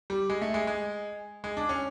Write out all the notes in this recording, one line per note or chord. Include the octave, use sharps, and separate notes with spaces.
G3
G#3
A3
G#3
G#3
G#3
D4
C#4